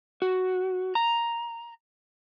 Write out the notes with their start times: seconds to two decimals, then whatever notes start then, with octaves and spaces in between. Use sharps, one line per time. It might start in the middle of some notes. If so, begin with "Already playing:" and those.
0.22 F#4
0.95 A#5